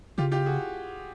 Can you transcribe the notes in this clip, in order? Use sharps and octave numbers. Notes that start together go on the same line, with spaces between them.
C#3 F4 G4
F4 G4
F#4 G#4